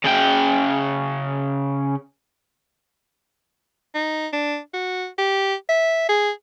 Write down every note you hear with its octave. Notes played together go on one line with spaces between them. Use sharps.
C#3 G5
D#4
D4
F#4
G4
E5
G#4